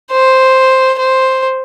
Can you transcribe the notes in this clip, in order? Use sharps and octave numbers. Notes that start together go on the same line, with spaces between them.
C5
C5